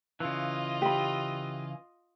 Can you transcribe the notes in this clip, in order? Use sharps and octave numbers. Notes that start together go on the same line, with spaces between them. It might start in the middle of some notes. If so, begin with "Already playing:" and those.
C#3 E3 F4 D#5
G4 B5